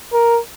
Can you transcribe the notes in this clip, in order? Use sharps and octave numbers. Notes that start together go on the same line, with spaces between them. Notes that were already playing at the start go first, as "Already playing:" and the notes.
A#4